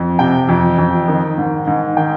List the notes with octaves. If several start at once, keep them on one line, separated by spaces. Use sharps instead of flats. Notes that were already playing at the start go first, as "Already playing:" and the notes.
Already playing: F2
C3 G5
F2
F2
D#3
G#2
G#2
D#3 G5